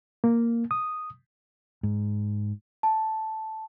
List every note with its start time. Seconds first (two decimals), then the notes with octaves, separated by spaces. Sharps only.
0.24 A#3
0.71 D#6
1.83 G#2
2.83 A5